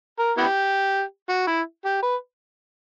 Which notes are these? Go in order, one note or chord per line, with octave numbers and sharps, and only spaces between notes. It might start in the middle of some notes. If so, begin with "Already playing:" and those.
A#4
B3 E4 G4
F#4
E4
G4
B4